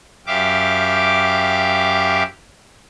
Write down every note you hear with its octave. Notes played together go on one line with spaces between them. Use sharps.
F#2 G4 E5 F5 D6